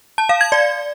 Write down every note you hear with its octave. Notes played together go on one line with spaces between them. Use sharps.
A5
F5
G#6
D5